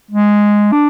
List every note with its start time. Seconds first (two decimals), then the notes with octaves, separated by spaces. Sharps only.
0.11 G#3
0.72 D4